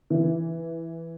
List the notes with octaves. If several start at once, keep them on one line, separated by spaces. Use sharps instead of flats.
E3